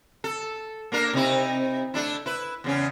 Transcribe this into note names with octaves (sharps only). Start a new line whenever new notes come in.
A4
A#3 D4 A#4
C3 D#4 E4
A3 D4 E4
E4 B4
E2 C#3 C#4